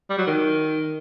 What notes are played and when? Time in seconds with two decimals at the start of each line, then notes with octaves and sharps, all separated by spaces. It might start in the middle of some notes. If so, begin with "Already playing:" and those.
0.10 G3
0.18 F#3
0.27 D#3